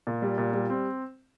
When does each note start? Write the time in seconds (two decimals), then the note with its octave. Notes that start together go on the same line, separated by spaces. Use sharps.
0.07 A#2
0.22 G3
0.38 A#2
0.53 G3
0.70 C4